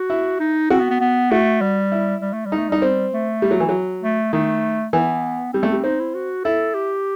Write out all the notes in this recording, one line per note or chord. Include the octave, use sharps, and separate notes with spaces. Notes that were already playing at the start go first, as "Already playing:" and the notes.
Already playing: F#4
E4
D#4
C4 F#4
B3
B3
B3
A3 F#4
G3
E4
G3
A3
G3
D#4
A3
G3 D#4
C4
A3
G3
F#3
E3
F#3
A3
D#3 A3
E3 B3
G3 C4
A3
G3
C4 D#4
E4
F#4
E4 A4
G4